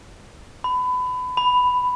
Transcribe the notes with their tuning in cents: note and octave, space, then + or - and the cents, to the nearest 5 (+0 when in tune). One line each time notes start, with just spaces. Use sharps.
B5 +25
B5 +10